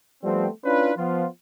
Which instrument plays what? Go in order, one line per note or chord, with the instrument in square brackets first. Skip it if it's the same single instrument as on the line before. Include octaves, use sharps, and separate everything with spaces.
[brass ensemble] F3 G3 A3 B3 C4
C#4 D4 E4 F4 B4
F3 B3 F4